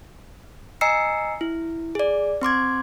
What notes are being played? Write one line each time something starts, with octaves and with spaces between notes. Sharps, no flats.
D#5 G#5 A#5 E6 C7 C#7
E4
G#4 D5
C4 C6 D6 G#6